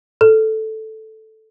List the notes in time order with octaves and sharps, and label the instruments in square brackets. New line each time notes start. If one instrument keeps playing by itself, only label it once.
[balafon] A4